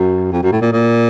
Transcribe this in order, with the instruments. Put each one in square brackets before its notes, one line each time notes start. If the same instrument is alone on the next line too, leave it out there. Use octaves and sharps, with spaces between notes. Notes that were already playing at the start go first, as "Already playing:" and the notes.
Already playing: [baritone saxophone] F#2
F2
F#2
A2
A#2
A#2